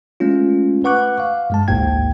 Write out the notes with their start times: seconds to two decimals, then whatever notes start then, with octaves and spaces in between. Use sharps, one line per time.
0.20 G#3 A3 C#4 F4
0.84 B4 F#5 C#6 D6 F#6
1.20 F5
1.50 G2 G#3 A5
1.68 A1 D2 G#2 A#3 G5 G#6